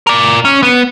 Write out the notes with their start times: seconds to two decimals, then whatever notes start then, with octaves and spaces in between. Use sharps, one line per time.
0.07 A#4 D5
0.45 C#4
0.63 B3